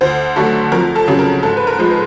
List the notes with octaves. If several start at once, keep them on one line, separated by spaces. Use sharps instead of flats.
D2 C5
D3 F#3 A3 A4
F2 A#4
A4
C#3 F#3
A#4
G#2 A4
B4
A#4
F3 G#3
B4